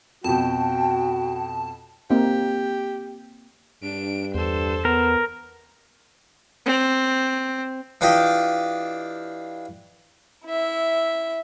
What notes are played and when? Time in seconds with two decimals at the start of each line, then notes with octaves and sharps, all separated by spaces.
0.24 F2 B2 F#4 G5 A5
2.10 A#3 C4 D#4 G4
3.83 G2 D4 D7
4.35 E2 A4 C5
4.85 B3 A#4
6.66 C4
8.01 E3 D4 F4 G4 D#5
10.45 E4 E5